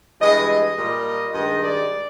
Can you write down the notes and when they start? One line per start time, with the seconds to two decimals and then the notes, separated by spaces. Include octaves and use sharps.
0.21 G2 E3 G#3 D#5
0.49 D#5
0.78 A#2 G3
1.34 G2 D#3 G#3 D#5
1.63 D5